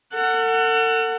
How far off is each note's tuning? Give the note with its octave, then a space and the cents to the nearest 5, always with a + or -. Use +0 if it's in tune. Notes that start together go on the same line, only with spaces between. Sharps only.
A4 +40 F#5 +0